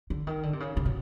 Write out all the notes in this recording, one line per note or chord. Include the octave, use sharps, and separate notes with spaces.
D3
D#3
D3
C3
C#3
C#3
B2